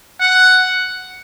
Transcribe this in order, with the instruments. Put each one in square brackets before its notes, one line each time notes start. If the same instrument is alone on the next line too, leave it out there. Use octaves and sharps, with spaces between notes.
[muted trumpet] F#5